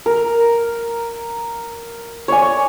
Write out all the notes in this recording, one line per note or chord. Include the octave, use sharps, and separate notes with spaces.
A#4
C#5 D5 G#5